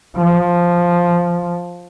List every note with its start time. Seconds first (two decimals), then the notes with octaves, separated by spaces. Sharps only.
0.16 F3